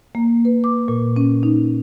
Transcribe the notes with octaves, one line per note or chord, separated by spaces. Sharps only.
A#3
B4
D6
A#2
C#4
D#4